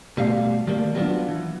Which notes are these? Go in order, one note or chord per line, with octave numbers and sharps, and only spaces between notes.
B2 G3 A3 F5
D#3 G3 A3 A#3
F#3 G3 B3 C#4 D4 F4
E3